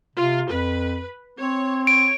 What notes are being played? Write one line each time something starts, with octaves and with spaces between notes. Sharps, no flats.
C3 F4
F2 B4
C4 C#5
C#5 D7